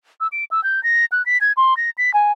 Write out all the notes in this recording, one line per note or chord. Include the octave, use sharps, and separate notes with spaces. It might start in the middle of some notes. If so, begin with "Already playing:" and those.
E6
D7
E6
G6
A#6
F#6
B6
G#6
C6
A#6
B6
G#5